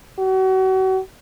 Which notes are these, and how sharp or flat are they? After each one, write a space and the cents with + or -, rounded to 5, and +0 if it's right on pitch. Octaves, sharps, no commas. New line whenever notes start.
F#4 +35